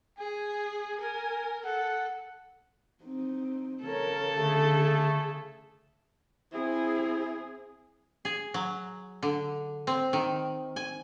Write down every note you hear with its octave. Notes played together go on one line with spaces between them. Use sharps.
G#4 G#5
A#4
A4 F#5
C4 D#4
C#3 A4 A#4 C#5
D3 A3 G#4
C4 E4 G#4
G#4
F#3
D3
C4
D#3
G#5